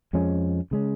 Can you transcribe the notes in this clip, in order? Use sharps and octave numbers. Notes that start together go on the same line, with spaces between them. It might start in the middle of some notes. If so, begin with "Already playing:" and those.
F2 F3 G#3 C#4
C#3 G#3 C#4